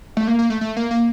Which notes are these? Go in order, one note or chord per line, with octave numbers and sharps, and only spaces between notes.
A3
A#3
A#3
A3
A3
A#3
A#3